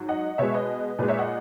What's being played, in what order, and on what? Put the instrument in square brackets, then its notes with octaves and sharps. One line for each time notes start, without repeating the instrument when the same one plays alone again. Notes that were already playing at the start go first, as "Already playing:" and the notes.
Already playing: [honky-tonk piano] G#2 F#3
D#5 F#5
B2 G#3 C#5 E5
B4 D#5
A#2 G#3 B4
C#5 E5
D#5 F#5